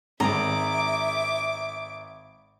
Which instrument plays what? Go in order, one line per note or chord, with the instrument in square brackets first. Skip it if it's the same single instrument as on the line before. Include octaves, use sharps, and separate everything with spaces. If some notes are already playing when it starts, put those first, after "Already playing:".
[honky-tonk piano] G#1 [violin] E5 D6 [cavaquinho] A#5